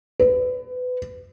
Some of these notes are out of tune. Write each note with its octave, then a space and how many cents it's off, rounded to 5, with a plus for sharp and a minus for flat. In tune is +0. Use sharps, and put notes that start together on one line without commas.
B4 +25